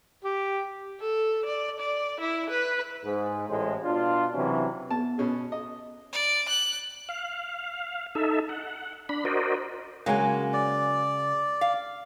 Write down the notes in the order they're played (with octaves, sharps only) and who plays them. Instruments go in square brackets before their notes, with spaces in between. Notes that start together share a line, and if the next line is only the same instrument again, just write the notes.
[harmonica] G4
[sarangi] A4
D5
D5
E4
B4
[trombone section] G#2
A1 A2 G#3 C5
B2 D4 F4
C3 E3 F#3 C#4
[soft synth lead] B3 [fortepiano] A5
[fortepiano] B2 C#4 G#4
D#5
[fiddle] D5
F#6
[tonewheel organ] F5
D#4 A4 E5
F#5
D4 B5
F#4 A#4 C5 D5 D#5
[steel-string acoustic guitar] C#3 G#3 G#5 [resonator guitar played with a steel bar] F#3 A#3
[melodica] D5
[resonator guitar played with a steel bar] F5